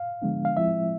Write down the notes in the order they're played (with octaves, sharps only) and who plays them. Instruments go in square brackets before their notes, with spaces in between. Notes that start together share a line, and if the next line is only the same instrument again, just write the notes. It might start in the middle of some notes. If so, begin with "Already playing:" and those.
Already playing: [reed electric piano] F5
D3 F3 G#3 B3 D4
F5
F3 G#3 C4 E4 E5